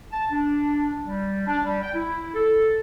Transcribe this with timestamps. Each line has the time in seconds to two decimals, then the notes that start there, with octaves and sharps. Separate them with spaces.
0.12 A5
0.32 D4
1.06 G3
1.47 D4
1.64 G3
1.82 G5
1.94 E4
2.34 A4